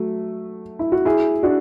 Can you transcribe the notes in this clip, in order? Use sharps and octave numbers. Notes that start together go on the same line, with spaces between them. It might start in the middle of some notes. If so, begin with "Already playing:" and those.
Already playing: F#3 A3
E4
F#4
E4 G#4
D4 F#4